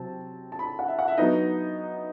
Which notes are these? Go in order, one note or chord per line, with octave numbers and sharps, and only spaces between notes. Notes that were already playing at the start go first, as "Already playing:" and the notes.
Already playing: C3 F#3 C4 A5
A5
B5
A5
F#5
E5
F#5
E5
F#3 B3 D#4 D#5